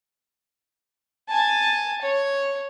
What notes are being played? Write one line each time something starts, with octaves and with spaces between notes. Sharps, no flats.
G#5 A5
C#5